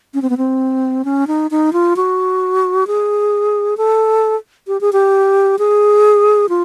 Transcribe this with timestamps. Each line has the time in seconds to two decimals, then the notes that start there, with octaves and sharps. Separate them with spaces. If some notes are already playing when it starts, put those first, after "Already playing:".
0.14 C#4
0.22 C4
0.30 B3
0.37 C4
1.05 C#4
1.27 D#4
1.51 D#4
1.73 F4
1.96 F#4
2.87 G#4
3.77 A4
4.67 G4
4.81 G#4
4.93 G4
5.59 G#4
6.49 F4